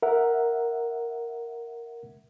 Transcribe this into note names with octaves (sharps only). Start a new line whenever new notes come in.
A#4 E5 F#5